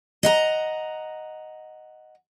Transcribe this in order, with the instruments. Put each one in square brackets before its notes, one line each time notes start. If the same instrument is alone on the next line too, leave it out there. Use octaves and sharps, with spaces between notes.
[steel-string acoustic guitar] D#5 F#5 A#5